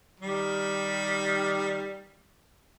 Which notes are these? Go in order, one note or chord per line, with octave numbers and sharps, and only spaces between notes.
D#3 G3 G4